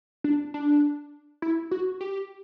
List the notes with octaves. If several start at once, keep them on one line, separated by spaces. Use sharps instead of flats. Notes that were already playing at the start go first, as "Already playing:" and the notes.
D4
D4
E4
F#4
G4